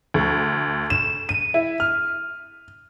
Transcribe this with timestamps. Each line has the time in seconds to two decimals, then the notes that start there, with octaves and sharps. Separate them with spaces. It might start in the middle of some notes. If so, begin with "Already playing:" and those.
0.14 D2
0.90 E7
1.29 D#7
1.54 E4
1.80 F6